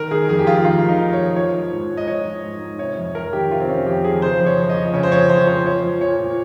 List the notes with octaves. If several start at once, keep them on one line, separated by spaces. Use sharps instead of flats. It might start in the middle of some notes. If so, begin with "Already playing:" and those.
Already playing: D#3 A#4
D#3 G#4
F2 G#4
G4
F2 F4
D#3 F4
D#3
D#4
F2
C#5
F2
F3 C#5
F3
G#2
G#2
D#5
F3 C#5
F3
G#2
G#2
C3 C#5
F2
F2 A#4
D#3 G4
C3 F4
C4
F2 C#4
F2 G4
D#3 G#4
C#3 C5
F2
C#5
F2
D#5
F3
C#3 C#5
C5
F2 C#5
F2 C5
F3 C5
F3 C#5
F3
A#2 C#5
A#2